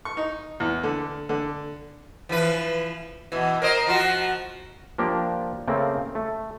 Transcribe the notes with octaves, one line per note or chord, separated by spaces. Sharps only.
C#6
D#4
E2
D3
D3
E3 F3 B4
B2 E3
A#4 C5 D#5
F3 F4 F#4
F3 A#3 D4 G4
C#3 A3 A#3 C4
A3